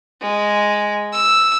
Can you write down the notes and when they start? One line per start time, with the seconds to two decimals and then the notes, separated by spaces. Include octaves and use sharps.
0.21 G#3
1.13 E6